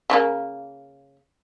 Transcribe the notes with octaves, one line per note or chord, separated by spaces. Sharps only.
C#3 G#3 A#3